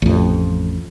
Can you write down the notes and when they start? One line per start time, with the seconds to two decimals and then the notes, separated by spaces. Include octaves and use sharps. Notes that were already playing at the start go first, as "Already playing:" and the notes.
0.02 A1 F2